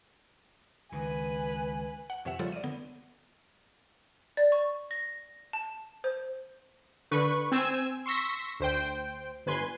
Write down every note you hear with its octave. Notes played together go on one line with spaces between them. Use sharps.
C#2 D#3 B4 G#5
F#5
F2 C3 E3 E5 F#5 E7
C#3 F3 G3 F4 A4 C#5
D5 D#7
D3 B3
D5
C#6
A#6
A5
C5
D3 B4 C#6
C4 G#5 E6 G#6 E7
C6 C#6 E6 A#6 B6
D2 C5 G5
G1 B4 G#5 C6